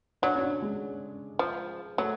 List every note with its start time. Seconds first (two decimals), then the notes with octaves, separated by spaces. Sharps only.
0.22 F#3 D4
0.35 C#4
0.42 D4
0.62 G#3
1.39 F3
1.97 F#3 A3